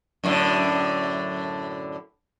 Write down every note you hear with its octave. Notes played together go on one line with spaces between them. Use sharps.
F#2 A2 D3